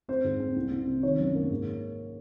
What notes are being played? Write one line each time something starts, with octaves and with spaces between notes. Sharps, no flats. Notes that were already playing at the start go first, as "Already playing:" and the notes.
C4 C5
G#2
C4
C2
C2
C3
D#3 C#5
F#2
A#3
G#2